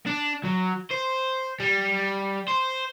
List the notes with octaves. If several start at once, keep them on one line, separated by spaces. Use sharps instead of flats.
D4
F#3
C5
G3
C5